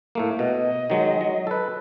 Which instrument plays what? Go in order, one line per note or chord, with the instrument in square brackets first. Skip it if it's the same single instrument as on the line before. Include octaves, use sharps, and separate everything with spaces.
[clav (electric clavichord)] A2 A3 A#3
[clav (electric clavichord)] B2 [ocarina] D#5
[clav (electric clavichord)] D#3 F#3 G#3
F#3
A4 B4